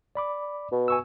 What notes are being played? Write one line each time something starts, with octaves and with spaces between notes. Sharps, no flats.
D5 B5 D6
B2
G#5 C#6 E6